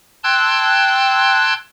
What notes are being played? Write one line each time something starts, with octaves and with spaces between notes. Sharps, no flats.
G5 A5 C6 E6 F#6 G#6